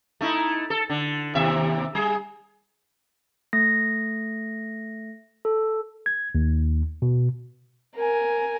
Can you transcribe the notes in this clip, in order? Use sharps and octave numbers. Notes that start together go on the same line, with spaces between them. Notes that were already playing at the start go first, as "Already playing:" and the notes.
A3 D#4 E4
A4
D3
D#2 C3 E5
G3 G#4
A3 A#6
A4
G#6
D#2
B2
A#4 G#5